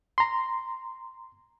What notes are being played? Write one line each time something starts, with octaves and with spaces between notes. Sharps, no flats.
A#5 C6